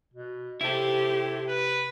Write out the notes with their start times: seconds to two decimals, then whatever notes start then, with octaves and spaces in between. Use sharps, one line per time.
0.14 B2
0.61 C3 E4 G4 A4 C5
1.49 B4